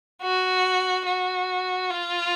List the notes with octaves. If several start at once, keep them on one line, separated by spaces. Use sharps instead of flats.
F#4
F#4
F4